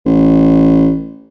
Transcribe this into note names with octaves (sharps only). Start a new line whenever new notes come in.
A1